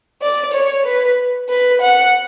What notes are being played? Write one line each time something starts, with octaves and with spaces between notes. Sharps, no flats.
D5
C#5
B4
B4
F#5